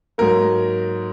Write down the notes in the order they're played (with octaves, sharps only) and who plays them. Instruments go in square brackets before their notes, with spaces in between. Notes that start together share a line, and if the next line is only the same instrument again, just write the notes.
[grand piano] G#2 F#3 A#3 A#4